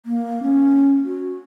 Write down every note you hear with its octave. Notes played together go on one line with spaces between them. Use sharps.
A#3
C#4
F#4